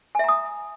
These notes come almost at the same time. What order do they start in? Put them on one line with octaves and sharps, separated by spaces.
G#5 E5 A#5 D#6